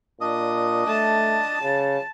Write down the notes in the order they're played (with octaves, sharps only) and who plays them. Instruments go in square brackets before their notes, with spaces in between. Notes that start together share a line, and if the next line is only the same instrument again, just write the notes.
[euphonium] A#2 [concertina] D4 D#5 D#6
[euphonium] A3 [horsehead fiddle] A5
[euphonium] C#3